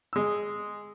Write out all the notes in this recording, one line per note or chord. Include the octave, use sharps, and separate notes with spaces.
G#3 E6